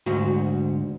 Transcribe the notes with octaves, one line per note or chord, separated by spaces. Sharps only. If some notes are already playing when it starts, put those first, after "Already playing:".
D2 G#2 F#4